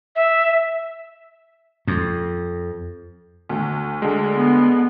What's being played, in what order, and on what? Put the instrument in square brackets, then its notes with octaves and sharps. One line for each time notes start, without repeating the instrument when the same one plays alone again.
[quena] E5
[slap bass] F2
[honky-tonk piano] D2
[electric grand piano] D3 G#3
[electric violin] B3